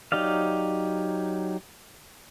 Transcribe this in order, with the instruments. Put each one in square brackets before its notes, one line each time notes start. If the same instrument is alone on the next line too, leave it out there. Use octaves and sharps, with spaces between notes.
[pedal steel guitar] F#3 D#4 G4 D5 F5